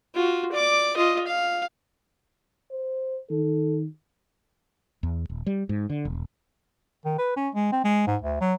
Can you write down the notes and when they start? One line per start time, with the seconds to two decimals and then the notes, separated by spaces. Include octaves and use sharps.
0.14 F4 F#4
0.52 D5 D6
0.97 F4 D#5
1.27 F5
2.71 C5
3.30 D#3 A4
5.03 E2
5.30 D#1
5.46 G3
5.69 G#2
5.90 D3
6.05 E1
7.05 D#3
7.18 B4
7.36 C#4
7.55 G#3
7.72 C4
7.84 G#3
8.07 G#2
8.22 D2
8.41 F#3